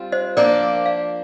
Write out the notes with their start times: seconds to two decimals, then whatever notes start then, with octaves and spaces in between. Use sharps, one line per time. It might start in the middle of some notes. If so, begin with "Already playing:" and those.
Already playing: G3 C4 F4
0.12 C5 D#5
0.37 F3 A#3 D4 A#4 D5
0.86 D5 F5